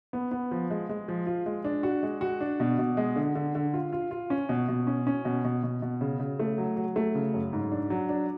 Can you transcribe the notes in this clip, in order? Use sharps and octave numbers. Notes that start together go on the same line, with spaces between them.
B3
B3
F3
G#3
G#3
F3
F4
G#3
D4
F#4
G#3
F#4
D4
B2
B2
G#3
D3
D3
D3
F4
F4
F4
C#4
B2
B2
C#4
C#4
B2
B2
B2
B2
C#3
C#3
A3
F#3
F#3
A3
C#3
F#2
G#2
D4
F#3
D4